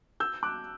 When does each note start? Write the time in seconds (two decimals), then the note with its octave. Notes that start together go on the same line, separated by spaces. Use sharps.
0.20 E6 G6
0.43 D6 F#6